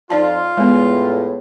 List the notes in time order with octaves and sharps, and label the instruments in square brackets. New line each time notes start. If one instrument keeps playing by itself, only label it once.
[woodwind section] F2 [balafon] D#4 D5 A5 [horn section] F4
[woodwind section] E2 A2 [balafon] G#3 B3